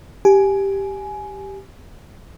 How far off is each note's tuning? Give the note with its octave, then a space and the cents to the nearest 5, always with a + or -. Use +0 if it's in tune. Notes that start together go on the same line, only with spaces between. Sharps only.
G4 +0 G#5 +15